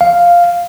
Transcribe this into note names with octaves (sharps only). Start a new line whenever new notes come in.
F5